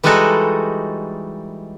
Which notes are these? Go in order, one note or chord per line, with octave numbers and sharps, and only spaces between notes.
E3 G3 G#3 D#4 F#4 A4